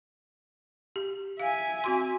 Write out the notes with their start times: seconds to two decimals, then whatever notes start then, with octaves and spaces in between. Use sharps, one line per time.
0.96 G4
1.40 E5 F5 G#5
1.84 C4 F#4 C6